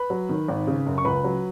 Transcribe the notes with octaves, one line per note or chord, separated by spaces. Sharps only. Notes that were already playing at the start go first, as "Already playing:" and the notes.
Already playing: B4 B5
F#3
D#3
G#1
C#3
F#2
C#6
C#2 B4 B5
F#3